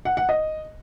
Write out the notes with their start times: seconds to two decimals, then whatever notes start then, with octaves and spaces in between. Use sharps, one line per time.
0.05 F#5
0.17 F#5
0.29 D#5